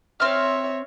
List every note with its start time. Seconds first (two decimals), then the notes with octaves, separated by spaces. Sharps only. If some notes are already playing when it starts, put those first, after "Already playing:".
0.20 C4 C#5 E5 F6